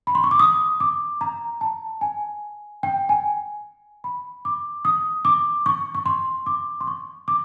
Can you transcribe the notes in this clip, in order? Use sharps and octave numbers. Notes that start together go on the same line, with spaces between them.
B5
C6
C#6
D6
D#6
D6
A#5
A5
G#5
G5
G#5
B5
D6
D#6
D6
C#6
C#6
C6
D6
C6
C#6
D6